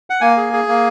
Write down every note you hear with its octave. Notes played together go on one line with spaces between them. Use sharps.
F#5
A#3 G#5
G#4
G#4
A#3